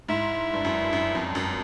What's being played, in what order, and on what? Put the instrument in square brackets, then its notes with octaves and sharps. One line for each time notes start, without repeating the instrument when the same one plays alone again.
[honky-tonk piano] G#2 [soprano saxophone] E4
[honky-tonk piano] G2
F#2
F#2
F2
F#2